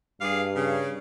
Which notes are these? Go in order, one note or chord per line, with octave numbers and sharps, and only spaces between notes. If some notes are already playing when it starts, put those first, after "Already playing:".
G2 G3 G#4 F5
C#3